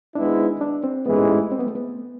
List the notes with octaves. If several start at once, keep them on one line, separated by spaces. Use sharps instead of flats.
G#1 G#2 G#3 B3 D4 E4
D4
C4
A1 G#2 E3 G#3 B3
A3
C4
B3
A3
B3